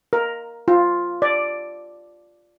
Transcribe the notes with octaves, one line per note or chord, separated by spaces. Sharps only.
A#4
F4
D5